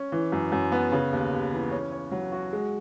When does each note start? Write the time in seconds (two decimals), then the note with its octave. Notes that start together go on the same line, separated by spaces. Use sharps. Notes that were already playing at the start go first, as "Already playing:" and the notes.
Already playing: C#4
0.12 E3
0.32 F#2
0.52 F#2
0.72 B3
0.92 C#3
1.13 D#2
1.32 D#2
1.53 E3
1.71 C#4
1.92 C#5
2.11 F#3
2.32 F#4
2.53 G#3